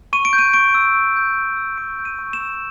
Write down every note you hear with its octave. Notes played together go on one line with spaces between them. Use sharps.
C#6 D#7
D7
G6
D#7
C#6 D7
E6
C#6
G6
C#6
E6
C#6 D7
G6
D#7
C#6
E7
E6